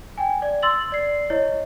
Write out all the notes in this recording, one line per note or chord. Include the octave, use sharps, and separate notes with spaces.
G5 G#5
D5
C6 E6 A6 F#7
D5 C7
E4 C#5 D#5